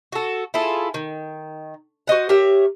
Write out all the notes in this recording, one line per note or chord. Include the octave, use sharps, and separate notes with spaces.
F#4 A4
E4 F4 G#4 A4
D#3
F#4 C5 D#5 F#5
G4 A#4 C#5 E5